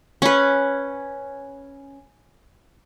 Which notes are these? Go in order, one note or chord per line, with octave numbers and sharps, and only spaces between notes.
C#4 B4